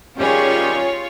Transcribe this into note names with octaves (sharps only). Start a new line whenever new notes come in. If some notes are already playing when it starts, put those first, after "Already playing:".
D#3 G3 C#4 F4 G#4 C#5